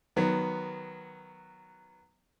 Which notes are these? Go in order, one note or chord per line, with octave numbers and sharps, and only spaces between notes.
D#3 F#3 B3